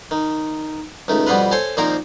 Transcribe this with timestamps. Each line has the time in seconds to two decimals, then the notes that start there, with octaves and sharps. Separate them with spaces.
0.11 D#3
1.08 C#2 D#3 A3
1.27 F2 B2 G3 B3 F4 B4
1.51 A4 C5 C#5 G#5 A5
1.77 A#2 D#3 F3 A#3 C4 A#4